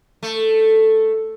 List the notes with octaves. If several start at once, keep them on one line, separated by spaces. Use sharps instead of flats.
A3